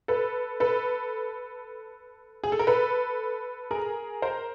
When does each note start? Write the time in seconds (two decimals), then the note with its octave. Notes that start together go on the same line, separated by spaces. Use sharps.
0.08 A4 B4
0.60 A4 B4
2.44 G#4
2.52 A4
2.59 A#4
2.67 A4 B4
3.71 G#4 A#4
4.22 A#4 C5